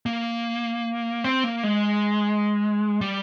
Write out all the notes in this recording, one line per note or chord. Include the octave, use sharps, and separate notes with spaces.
A#3
C4
A#3
G#3
G3